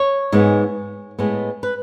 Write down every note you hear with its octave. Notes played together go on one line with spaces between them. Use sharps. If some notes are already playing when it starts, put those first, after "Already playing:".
Already playing: C#5
G#2 G#3 B3
A2 G#3 B3
B4